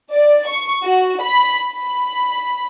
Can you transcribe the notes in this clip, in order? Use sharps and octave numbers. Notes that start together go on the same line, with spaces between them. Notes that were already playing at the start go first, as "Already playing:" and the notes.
D5
C#6
F#4
B5
B5